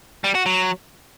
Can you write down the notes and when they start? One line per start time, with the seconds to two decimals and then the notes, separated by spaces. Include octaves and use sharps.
0.24 G3
0.35 F#4
0.46 F#3